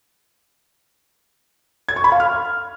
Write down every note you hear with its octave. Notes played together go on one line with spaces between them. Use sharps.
G#6
C#6
B5
F5
F6